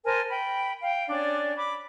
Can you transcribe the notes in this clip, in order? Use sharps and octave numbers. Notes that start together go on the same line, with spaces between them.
A#4 C5 G#5 A5
G5 B5
F5 G5
C#4 D4 D5
B5 D6